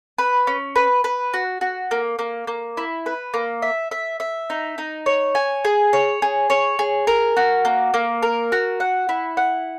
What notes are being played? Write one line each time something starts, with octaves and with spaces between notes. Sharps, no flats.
B4
C#4
B4
B4
F#4
F#4
A#3
A#3
A#3
E4
B4
A#3
E5
E5
E5
D#4
D#4
C#5
G#5
G#4
C#5
G#4
C#5
G#4
A#4
F#4
A#3
A#3
A#4
F#4
F#5
E4
F#5